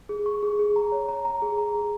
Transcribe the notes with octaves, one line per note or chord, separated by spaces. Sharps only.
G#4
C#6
G#4
G#4
A#5
C#5
A#5
A#5
G#4
A#5
G#4